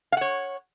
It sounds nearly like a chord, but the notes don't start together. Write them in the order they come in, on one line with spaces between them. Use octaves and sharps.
F5 F#5 C#5